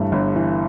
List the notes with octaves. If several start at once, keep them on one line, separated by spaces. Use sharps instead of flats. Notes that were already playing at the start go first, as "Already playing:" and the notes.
Already playing: G1 G2 E3 A3
G1
E3